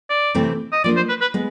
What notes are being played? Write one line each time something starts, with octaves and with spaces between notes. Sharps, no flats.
D5
C3 E3 A3 C4
D#5
F3 A#3 D4 D5
C5
B4
B4
G#3 B3